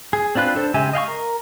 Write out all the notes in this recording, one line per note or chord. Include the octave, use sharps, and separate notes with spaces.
G#4
C4 D4 F4 B4 F#6
D4 A4 C5
C#3 G#3 G4 E5 G#5
D#5 F5 G5 C#6
A#4